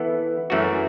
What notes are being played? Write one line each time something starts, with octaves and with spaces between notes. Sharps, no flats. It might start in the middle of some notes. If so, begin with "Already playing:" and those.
Already playing: E3 B3 E4 A4
F#2 E3 A3 C#4 F#4